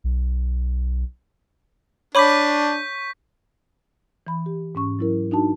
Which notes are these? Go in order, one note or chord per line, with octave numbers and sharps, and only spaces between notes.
B1
D4 C#5 B5 C#6 D6 G6 B6
E3 B5
G4
G#2 C#4 C#6
F#3 E4 A#4
D4 D#4 F#4 A5